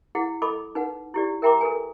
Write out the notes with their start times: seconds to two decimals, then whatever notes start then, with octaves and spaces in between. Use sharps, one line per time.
0.15 E4 G#4 F#5
0.42 A4 D#5 B5 D6
0.75 D#4 B4 F#5
1.14 E4 G4 D5
1.42 A#4 E5 G5 A#5 C6 D6
1.61 A4 B4 G#5